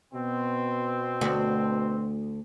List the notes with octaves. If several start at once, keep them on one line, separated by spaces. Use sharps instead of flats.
B2 C4
D2 F#4